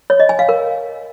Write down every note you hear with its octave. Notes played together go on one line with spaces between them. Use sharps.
C#5
D#5
G#5
F5
A#4